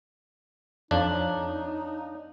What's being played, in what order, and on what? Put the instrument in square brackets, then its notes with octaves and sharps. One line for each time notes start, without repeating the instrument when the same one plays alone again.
[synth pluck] F2 [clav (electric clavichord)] D4 [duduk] D#4 [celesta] C#5 F5